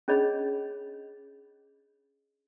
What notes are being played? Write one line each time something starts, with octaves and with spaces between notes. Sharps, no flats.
C#4 D4 G#4 C#5 D#5 B5